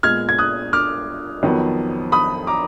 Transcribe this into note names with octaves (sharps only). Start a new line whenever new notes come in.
A#2 G#3 B3 F6 G#6
G#6
D#6 F#6
D6 F6
F2 D#3 F#3 B3
B5 D#6
A#5 D6